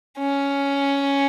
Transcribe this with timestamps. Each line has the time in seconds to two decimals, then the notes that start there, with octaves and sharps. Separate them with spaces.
0.19 C#4